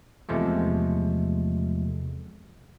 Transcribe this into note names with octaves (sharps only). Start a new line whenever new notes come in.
E2 C3 F3 G#3 A3